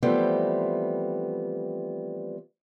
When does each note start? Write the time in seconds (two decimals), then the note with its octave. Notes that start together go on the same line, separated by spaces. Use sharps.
0.03 E3 F3 G3 A3 B3 C4